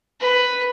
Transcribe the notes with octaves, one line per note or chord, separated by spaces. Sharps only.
B4